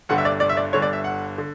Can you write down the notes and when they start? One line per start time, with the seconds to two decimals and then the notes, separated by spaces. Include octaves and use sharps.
0.09 G1 G2 D3 G3 F#5
0.18 E5
0.25 D5
0.40 D5
0.49 E5
0.57 D5
0.73 G1 G2 D3 G3 C#5
0.82 D5
0.93 E5
1.04 F#5
1.38 D3